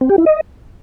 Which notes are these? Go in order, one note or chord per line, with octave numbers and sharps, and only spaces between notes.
C4
G4
E4
D#5